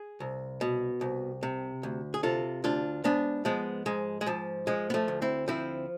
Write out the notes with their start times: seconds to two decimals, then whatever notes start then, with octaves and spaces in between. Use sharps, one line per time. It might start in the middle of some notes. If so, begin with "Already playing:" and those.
Already playing: G#4
0.20 C2
0.61 B2
1.01 C2
1.43 C3
1.83 D2
2.14 G#4
2.23 C3 F4 A4
2.64 D2 D4 F4
3.04 G#2 B3 D4
3.45 F3 G#3 B3
3.86 G#2 G#3
4.21 G#3
4.26 G#2 F3
4.67 F3 G#3
4.90 B3
4.94 F3 A3
5.08 D2
5.22 C4 E4
5.48 F3 C4 E4